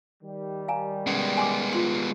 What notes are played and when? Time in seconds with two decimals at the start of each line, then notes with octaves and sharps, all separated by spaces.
0.23 D#3 G3
0.68 F5 G#5 A#5
1.07 G#3 B3 C#4
1.37 G#5 C6 D6
1.73 F4 C6